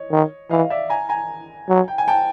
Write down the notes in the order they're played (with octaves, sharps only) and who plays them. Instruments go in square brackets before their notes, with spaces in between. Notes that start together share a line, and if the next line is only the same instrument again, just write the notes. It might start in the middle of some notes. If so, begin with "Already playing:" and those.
Already playing: [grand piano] C#5 D#5
[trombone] D#3
[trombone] E3 [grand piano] D#5 F5
[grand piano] D5 E5
G#5 A#5
G#5 A#5
[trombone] F#3
[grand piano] G5
G#5
G5 A5